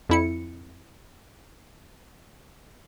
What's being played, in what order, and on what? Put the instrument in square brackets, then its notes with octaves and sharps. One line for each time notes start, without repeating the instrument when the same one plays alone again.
[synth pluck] F2 E4 C#7